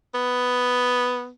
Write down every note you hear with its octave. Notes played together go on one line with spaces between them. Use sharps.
B3